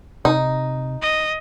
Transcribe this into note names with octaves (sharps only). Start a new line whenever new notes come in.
C3 D#4
D#5